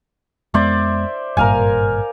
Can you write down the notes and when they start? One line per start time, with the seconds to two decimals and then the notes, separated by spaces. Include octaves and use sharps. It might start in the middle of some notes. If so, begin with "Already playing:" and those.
0.54 F2 G#3 B3 C5 D5 E5
1.37 G#1 G2 A#2 A#4 F5 G#5